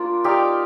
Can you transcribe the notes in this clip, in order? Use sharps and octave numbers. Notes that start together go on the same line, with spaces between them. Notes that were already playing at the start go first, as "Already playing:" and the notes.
Already playing: A#3 D4 F4 C5
D#4 G4 D5 F5